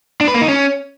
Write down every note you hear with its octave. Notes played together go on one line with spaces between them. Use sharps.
D4
B4
A#3
D#4
C#4